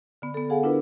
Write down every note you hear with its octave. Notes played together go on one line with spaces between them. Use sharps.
D3 B3
B3 A4
G#4 A4 F5 F#5 G#5
D4 E4 F4 A#4 B4